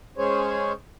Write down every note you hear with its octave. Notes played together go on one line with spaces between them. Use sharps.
G#3 C#4 G#4 C5 C#5